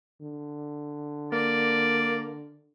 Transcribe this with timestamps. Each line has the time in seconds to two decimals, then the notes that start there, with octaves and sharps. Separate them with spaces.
0.21 D3
1.32 A#3 D5